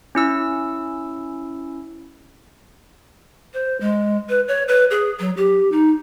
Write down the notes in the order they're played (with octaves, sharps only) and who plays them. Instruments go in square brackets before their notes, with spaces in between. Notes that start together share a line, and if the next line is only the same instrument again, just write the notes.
[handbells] C#4 E4 E6
[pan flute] C5
G#3
B4
C#5
B4
G#4
F#3
G4
D#4